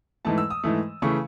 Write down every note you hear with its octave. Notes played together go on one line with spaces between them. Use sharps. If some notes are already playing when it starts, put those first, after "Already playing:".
G#2 E3 A3 A5
E6
D#6
G#2 E3 A3
C#3 E3 A3 C#6